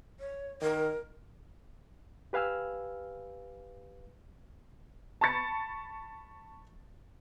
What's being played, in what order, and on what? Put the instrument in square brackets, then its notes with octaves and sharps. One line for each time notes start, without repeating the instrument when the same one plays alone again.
[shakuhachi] C#5
[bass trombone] D#3 [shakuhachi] A#4
[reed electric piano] G4 B4 F5 G#5 E6 F6
[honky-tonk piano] A5 B5 C#6 A6 C#7